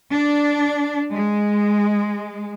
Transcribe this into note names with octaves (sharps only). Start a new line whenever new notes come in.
D4
G#3